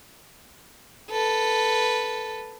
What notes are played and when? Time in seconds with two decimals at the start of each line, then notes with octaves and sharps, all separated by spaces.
1.11 A4 B4